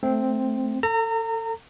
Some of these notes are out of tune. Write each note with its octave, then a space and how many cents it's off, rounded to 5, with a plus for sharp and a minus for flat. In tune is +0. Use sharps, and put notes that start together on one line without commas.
A3 +0 C4 +0
A4 +25 A#5 -30